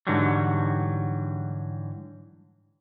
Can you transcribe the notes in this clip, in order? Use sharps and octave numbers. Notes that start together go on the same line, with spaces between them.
G#2 D3 E3 F#3 G3